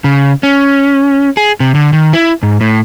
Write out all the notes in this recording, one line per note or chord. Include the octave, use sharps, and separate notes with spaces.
C#3
C#4
G#4
C3
D3
D#3
E4
G#2
A2